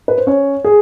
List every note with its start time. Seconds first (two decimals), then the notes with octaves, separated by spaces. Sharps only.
0.08 B4
0.18 C5
0.27 C#4 C#5
0.64 G#4